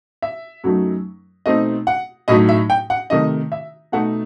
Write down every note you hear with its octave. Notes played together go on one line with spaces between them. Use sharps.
E5
F#2 F#3 A3 D#4
B2 A3 C4 D#4 D#5
F#5
A2 F#3 A3 D#4 D#5
E5
G5
F#5
C3 D#3 A3 D#4 D#5
E5
B2 A3 D#4 F#5